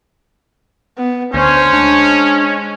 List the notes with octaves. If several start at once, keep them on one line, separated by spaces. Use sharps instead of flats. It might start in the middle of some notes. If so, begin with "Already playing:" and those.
B3
D2 C#4 C5
G#3 D4